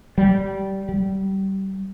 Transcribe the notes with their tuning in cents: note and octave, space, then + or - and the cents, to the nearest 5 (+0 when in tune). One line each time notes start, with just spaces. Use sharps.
G3 -15
G3 -25